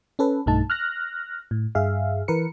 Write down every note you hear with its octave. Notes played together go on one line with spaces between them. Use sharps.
C#4 A4 B4
B1 G2 A3 D#4 A5
F6 F#6 A#6
A2
G2 G#4 E5 F5
E3 A#4 B4 C#7